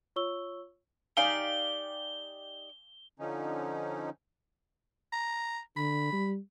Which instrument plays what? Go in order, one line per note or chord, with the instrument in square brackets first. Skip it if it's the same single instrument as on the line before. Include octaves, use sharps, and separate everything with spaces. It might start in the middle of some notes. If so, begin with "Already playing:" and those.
[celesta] F4 C#5 C#6 E6 G7
[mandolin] D#4 G4 D5 [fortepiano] F5 G#5 [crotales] G7
[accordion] D3 F3 C#4 D#4
[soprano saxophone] A#5
[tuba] D3 [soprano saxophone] B5
[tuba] G3